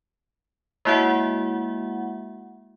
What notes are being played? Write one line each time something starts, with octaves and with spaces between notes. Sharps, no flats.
G#3 A#3 E4 F#4 E5 F#5